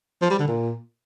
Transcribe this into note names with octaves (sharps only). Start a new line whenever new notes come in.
F3
G3
D3
A#2